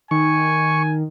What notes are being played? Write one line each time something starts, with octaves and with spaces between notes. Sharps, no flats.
D#3 G#5 C#6